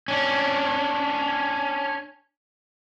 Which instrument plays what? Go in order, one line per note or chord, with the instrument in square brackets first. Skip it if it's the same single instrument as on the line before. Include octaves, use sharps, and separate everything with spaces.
[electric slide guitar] C#4 D4